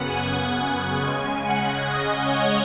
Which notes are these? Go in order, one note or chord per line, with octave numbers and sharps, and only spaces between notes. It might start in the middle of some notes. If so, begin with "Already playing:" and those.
Already playing: F#2 C#3 B3 F#5
G#5
C#3 G#3 C#4 G#5
F#5
D#5
C#5